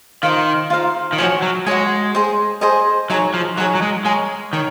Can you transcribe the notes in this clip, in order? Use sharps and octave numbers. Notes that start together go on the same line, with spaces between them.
D#3 F4 C5 F5 A#5
F4 C5 F5 A#5
D#3
F3 F#4 C#5 G#5
F#3
G#3 F#4 C#5 G#5
G#4 C5 D#5
G#4 C5 D#5
F#3 D#4 G#4 C#5
F3
F#3 D#4 G#4 C#5
F#3
G#3
G#3 A#4 C#5 G#5
D#3 A#4 C#5